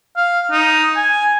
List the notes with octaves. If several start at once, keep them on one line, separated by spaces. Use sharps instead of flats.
F5
D#4
G#5